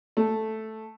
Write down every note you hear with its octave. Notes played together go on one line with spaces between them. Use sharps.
A3